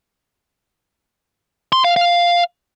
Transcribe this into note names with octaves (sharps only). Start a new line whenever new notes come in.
C6
F5
F5